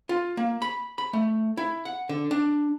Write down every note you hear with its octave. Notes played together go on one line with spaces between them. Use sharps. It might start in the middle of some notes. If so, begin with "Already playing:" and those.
F4
A#3
B5
B5
A3
E4
F#5
D3
D4